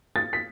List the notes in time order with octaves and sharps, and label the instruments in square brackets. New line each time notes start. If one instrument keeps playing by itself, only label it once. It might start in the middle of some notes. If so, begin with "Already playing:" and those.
[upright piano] A6
B6